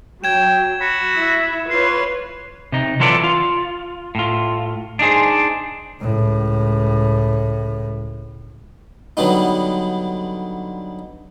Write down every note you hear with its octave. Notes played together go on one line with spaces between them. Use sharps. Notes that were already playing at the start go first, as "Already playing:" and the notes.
F#3 G5 G#6 E7
F#4 B5
E4 E5
F4 B4 C#5 C6
C3 D#4
E3 F#3 F4 A4 B4 D5
F4
A2 F4
D4 D#4 G#4 C5
C#2 A2
D3 F#3 G3 B3 D#4